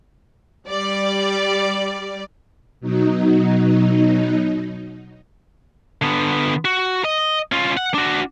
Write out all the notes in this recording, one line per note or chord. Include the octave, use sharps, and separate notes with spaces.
G3 D5
B2 F#3 D#4
D3 B3
F#4
D#5
C#4 F4
F#5
D4 F#4